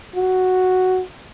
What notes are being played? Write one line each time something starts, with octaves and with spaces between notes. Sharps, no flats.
F#4